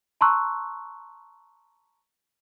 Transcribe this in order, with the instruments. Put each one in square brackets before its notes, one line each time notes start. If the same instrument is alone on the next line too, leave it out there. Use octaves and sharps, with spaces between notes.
[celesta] A5 A#5 C6 C#6 E6 F#6